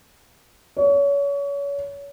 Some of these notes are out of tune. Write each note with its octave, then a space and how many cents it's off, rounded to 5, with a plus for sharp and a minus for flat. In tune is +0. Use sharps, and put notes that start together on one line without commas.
C#5 +30